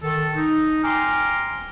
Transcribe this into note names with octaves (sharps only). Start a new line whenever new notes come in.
D#3 A4
D#4
G5 G#5 A#5 C6 D6 F6